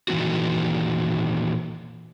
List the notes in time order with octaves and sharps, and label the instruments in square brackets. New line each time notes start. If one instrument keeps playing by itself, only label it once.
[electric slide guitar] A#2 D#3 E3 C4 F#4